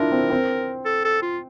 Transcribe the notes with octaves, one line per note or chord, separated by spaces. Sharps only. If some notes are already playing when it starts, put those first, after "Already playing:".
Already playing: D4 E4 F4 A#4
C4
C4
A4
A4
F4